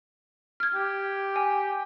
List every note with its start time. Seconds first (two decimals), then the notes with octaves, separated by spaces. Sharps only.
0.60 F6 G#6
0.75 G4
1.36 G#5